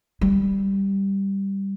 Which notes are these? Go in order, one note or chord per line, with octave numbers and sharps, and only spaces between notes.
G3